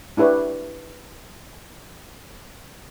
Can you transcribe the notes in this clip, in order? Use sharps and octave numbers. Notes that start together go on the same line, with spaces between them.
D4 E4 G4 B4 C#5